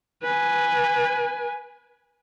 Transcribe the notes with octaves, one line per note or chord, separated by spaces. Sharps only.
B4 G#5